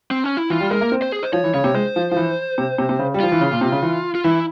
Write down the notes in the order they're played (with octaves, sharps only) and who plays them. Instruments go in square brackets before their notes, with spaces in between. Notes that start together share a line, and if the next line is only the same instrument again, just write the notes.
[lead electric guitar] C4
C#4
E4
[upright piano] E3 [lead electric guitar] F4
[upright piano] G3
[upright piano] G#3 [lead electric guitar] A#4
[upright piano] A#3
C4
[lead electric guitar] C5
G#4
C5
[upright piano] F3 [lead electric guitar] C#5
[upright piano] E3
[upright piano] C#3 [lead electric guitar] C#5
[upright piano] C3
[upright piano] G#3 [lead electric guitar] C5
[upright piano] F3
F3
E3
C3
C3
C3
C#3
G3
[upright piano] F3 [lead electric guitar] F4
[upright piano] E3
C#3
A#2
C3
C#3
E3
[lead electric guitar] F4
[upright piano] E3 [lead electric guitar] E4